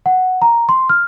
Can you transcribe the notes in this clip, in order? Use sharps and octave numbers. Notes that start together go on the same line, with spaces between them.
F#5
A#5
C6
F6